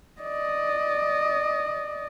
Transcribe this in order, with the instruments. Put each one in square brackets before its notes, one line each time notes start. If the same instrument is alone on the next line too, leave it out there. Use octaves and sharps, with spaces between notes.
[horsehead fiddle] D5 D#5